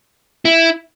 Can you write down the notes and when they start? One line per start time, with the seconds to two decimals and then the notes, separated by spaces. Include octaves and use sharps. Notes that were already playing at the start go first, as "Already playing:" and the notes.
0.45 E4